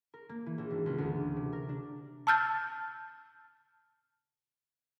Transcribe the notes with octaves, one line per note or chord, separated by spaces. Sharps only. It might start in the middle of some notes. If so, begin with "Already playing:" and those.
A#4
A#3
E3
A#1
G#1
C#2
D2
D6
C3
A#4
D4
A5 E6 F6 G6 A6